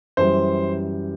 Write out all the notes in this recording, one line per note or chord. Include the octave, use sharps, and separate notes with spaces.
F#2 E3 G3 C5